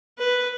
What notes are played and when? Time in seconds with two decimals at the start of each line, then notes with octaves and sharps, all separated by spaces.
0.19 B4